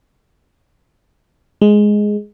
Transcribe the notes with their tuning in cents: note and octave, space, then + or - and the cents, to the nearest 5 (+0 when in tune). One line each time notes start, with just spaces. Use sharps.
G#3 +5